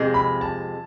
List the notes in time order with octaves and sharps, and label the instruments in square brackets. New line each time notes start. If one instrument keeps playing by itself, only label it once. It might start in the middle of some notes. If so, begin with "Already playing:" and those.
Already playing: [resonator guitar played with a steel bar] F2 C3 G#3
[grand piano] B5
A5